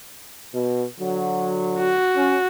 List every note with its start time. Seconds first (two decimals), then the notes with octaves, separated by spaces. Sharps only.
0.54 B2
0.99 D3 F#3
1.79 F#4
2.16 C#4